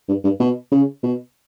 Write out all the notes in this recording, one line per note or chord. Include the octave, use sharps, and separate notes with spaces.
G2
G2
B2
C#3
B2